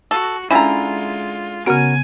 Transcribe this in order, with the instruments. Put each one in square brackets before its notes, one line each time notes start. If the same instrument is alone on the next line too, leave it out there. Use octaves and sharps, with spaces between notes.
[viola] F#4 [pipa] A4
[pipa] D3 E4 [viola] G#3 F4 [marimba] C#4 [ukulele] G#5 A#5
[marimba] C#3 B3 [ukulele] C#4 F#4 A#4 [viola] G#5